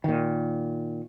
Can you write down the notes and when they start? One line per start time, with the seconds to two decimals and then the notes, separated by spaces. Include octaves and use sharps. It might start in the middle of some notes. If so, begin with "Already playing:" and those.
0.04 A#2 D#3